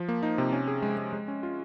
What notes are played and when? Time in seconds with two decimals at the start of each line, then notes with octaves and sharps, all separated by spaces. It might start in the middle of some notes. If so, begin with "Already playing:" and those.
Already playing: F3
0.09 A#3
0.23 D#4
0.38 C3
0.53 C#4
0.68 G#4
0.82 G#3
0.97 G#3
1.13 G#3
1.28 C#4
1.43 F4